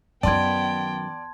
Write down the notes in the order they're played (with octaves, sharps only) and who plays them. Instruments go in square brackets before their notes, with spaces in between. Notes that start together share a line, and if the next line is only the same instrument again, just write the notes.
[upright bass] F#2 D#3 [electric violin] B3 G5 [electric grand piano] D5 [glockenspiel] A5 C6 G#6